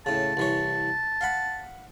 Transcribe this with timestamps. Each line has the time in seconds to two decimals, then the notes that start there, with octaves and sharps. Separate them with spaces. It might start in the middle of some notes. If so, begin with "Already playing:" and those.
0.06 A2 C#3 A5
0.37 C2 E3 C#5
1.21 F5 F#5 B5